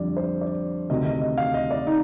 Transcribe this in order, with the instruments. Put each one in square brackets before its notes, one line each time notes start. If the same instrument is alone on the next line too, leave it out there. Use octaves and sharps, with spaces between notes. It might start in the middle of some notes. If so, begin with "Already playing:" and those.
Already playing: [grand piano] F2 D3 G3 D5
C5
D5
D2 C3 D#3 D#5
D#5
D#5
F5
D#5
D5
D#4